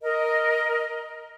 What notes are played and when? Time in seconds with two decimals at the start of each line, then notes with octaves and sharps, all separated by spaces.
0.02 A#4 D#5